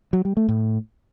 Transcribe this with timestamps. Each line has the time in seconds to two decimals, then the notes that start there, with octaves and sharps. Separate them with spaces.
0.13 F#3
0.25 G3
0.37 A3
0.49 A2